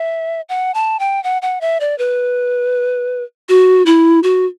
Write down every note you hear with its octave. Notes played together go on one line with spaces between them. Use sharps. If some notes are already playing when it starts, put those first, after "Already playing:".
Already playing: E5
F#5
A5
G5
F#5
F#5
E5
D5
B4
F#4
E4
F#4